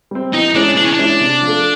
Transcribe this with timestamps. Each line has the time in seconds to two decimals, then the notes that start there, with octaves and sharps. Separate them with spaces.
0.11 G3 C4
0.33 E3 D#4
0.55 G#3 C#4 D4 E4
0.76 E3 D4
0.85 C#4
0.93 D4
0.99 G#3 C#4 E4
1.21 C3
1.43 F3 A3